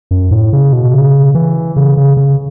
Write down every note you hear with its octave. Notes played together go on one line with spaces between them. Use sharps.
F#2
A2
C#3
B2
C#3
E3
C#3
C#3
C#3